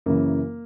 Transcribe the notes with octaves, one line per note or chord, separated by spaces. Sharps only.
F#2 C#3 E3 A#3